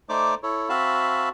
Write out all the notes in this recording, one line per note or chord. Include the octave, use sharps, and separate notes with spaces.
A3 D#4 C5 D5 D6
E4 A4 C#5
C4 F#4 E5 F5 A5 B5